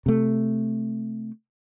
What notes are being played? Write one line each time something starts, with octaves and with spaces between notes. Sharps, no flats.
C3 A3